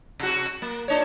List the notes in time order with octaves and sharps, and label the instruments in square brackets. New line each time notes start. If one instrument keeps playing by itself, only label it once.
[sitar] C3 F#4
A#3
A#2 D4 C#5